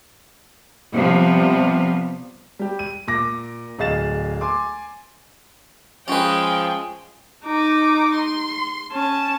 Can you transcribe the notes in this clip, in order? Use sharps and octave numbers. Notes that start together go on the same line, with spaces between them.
C3 F3 G3 B3
G3 G4
D#7
A#2 D6 A#6
D1 G#4 D#5 F5 A6 E7
G#5 C6 D6
F3 G#3 C#4 B4 G5
D#4 D6
C6
C#4 A5